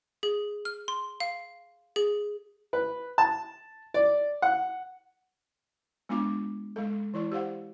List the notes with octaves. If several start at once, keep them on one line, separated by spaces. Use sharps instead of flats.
G#4
F6
C6
F5
G#4
B4
A5
D5
F#5
G#3 B3 D4 F4 D6
G#3 A4
E3 E4 D5
G4 C5 F5 F#5